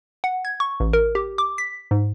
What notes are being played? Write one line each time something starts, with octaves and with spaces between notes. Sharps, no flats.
F#5
G#6
C#6
A1
A#4
G4
D6
B6
G#2